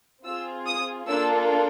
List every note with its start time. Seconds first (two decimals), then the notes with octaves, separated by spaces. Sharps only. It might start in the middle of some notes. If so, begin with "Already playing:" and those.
0.25 C4 F4 G#4 E6
0.66 D#6
1.08 A#3 D4 F4 A4 E6